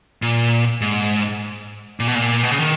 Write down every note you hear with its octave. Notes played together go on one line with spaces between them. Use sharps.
A#2
G#2
A#2
B2
A#2
B2
C#3
D#3